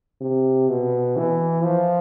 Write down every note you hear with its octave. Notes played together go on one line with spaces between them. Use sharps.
C3
B2
E3
F3